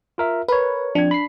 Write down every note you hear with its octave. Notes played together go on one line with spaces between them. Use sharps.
F4 A#4 E5
A#4 B4 C#5
F3 C4 D4 G#6
B5 B6 C7